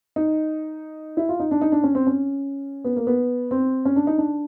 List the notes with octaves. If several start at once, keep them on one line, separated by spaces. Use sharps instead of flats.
D#4
E4
F4
D#4
D4
D#4
D4
C#4
C4
C#4
B3
A#3
B3
C4
C#4
D4
D#4
D4